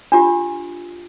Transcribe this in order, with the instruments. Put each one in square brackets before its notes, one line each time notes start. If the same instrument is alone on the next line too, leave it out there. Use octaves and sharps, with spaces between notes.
[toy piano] D4 F4 G4